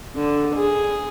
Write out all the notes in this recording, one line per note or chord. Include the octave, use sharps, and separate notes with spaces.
D3
G#4